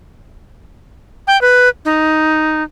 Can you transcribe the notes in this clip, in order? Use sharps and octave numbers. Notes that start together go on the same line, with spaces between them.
G5
B4
D#4